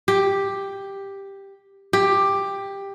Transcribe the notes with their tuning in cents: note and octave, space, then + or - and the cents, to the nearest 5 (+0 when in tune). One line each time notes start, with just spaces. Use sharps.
G4 +5
G4 +10